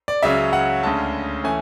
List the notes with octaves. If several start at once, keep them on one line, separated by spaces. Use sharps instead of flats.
D5
C#2 C#3 F#3 C#4 E5
F#5
D2 C#3 G#3 C#4 A5
E3 A3 C#4 G#5